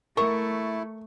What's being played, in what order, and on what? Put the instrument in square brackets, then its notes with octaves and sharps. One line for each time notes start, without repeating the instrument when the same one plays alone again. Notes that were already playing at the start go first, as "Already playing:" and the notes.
[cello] A3 [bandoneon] E4 [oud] A#4 [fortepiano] C#6